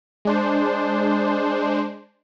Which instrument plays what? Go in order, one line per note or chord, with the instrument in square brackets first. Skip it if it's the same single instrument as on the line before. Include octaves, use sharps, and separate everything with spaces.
[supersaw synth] G#3 D4 C5